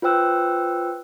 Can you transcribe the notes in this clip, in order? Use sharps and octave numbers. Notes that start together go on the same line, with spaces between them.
F4 B4 C5 G5 E6 F#6